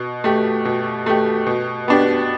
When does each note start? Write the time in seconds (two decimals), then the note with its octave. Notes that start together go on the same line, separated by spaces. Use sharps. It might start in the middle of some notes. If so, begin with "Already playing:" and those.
Already playing: B2
0.24 A3 G4
0.65 B2
1.06 A3 G4
1.47 B2
1.88 B3 D4 G4